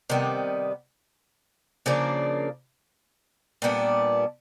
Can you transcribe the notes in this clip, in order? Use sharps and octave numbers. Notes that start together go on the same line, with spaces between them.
C3 D#3 G3 B3
C#3 F3 A#3 D4
A#2 G3 B3 D4